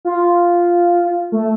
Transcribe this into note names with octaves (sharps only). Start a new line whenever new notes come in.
F4
A3